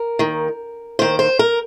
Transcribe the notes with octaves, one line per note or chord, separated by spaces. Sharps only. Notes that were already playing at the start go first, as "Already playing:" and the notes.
Already playing: A#4
D#2 D#3
D#2 D#3 C5
C5
A#4